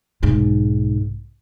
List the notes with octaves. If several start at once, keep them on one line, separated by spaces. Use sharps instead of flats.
B1 G#2